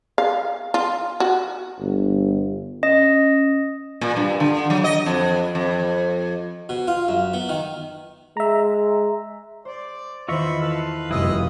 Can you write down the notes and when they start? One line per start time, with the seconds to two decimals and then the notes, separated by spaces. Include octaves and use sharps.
0.18 F5
0.74 F4
1.20 F#4
1.80 G1
2.83 C#4 D#5
4.01 A#2
4.16 G2
4.40 D3
4.70 F#3
4.84 D#5
5.06 F2
5.55 F2
6.69 B2
6.88 F4
7.08 F#2
7.33 B3
7.49 D#3
8.37 G#3 E5 A#5
9.65 C5 D5
10.28 E2 D#3 F4 C5 D#5 E5 B5 C#6
10.62 A4 B4 F5
11.11 F1 F#2 G3 E4 F4 B4 D#5 E6